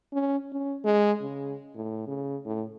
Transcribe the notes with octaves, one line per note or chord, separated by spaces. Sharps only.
C#4
C#4
G#3
C#3
A2
C#3
A2